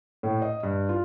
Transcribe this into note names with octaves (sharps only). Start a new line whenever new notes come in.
A2
D#5
G2
F4